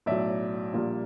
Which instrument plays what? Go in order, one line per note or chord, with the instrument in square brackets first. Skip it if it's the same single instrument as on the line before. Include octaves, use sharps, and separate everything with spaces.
[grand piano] B1 A2 F#3 D5 E5
A#1 A#2 G3 A#3